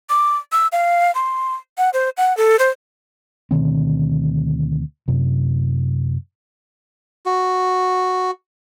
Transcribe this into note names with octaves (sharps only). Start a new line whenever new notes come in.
D6
E6
F5
C6
F#5
C5
F#5
A4
C5
D2 B2 D#3 C4
F#2 C3
F#4